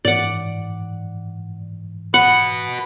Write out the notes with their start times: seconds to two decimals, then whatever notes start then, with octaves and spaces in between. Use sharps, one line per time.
0.05 G#2 E3 D5 F#5
2.14 F#4 B4 F#5